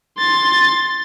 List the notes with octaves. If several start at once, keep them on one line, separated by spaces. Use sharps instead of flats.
C6 A6